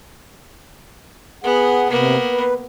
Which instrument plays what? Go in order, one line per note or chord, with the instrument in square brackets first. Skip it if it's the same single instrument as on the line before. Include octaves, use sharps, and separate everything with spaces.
[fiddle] B3 [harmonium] G#4 F#5
[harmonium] C3 [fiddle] A#3 B3
[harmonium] B4